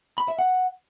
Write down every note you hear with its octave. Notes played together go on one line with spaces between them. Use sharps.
B5
E5
F#5